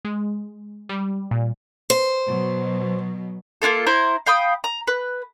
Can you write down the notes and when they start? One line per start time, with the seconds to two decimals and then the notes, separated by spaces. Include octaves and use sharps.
0.05 G#3
0.89 G3
1.31 A#2
1.90 C5
2.26 B2 F#3
3.62 A#3 D4 F4 A4
3.86 E4 C5 A#5
4.26 F5 G5 B5 D#6
4.64 A#5
4.87 B4